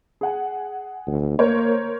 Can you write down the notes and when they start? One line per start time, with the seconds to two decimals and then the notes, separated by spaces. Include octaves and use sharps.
0.21 G#4 F#5 G#5
1.07 D2
1.39 A#3 A#4 C5 C#5